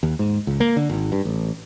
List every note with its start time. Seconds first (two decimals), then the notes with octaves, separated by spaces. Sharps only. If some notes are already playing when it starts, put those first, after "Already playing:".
0.03 D#2
0.19 G#2
0.47 C#2
0.60 A#3
0.76 D3
0.89 G#1
1.12 G2
1.25 A1